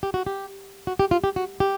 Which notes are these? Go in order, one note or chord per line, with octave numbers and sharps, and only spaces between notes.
G4
F#4
G4
F#4
G4
F4
G4
F#4
G4